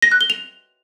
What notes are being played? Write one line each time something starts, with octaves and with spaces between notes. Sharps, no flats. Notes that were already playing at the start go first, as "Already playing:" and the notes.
A#6
F#6
G7
F7